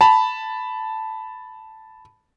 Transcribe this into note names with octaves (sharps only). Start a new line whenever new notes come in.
A5 B5